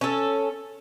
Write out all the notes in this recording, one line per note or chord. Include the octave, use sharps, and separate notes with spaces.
C#4 A4